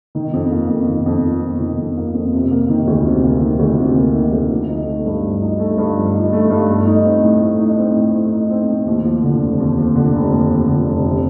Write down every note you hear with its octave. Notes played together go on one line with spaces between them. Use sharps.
D#3
F2
A#3
F2
D#3
F2
A#3
F2
D#3
F2
A#3
F2
C3
A#3
D#3
D2
C3
A#3
D#3
D2
C3
A#3
D#3
D2
F3
D#4
A3
G2
F3
D#4
A3
G2
F3
D#4
A3
G2
A3
D#4
C4
A2
A3
D#4
C4
A2
A3
D#4
C4
A2
D#2
F3
D3
F1
D#2
F3
D3
F1
D#2
F3
D3
F1
C3